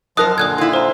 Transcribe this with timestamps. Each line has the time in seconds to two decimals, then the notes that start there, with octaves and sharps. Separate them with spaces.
0.17 F#2 F3 A#4 D#5 D#6 F#6
0.38 A#2 D3 D#6 F#6 G#6
0.58 E4 F4
0.73 C5 A#5